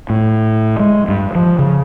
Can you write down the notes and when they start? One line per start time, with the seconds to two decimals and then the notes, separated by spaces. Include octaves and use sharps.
0.10 A2
0.80 G#3
1.08 G2
1.35 F3
1.59 C#3